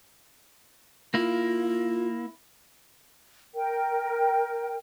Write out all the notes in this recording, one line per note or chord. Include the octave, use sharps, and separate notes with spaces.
A#3 E4 F4
A#4 G5